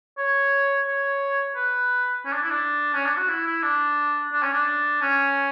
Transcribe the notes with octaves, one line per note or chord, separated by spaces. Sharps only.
C#5
C#5
B4
C#4
D4
E4
D4
C#4
D4
F#4
E4
E4
D4
D4
C#4
D4
C#4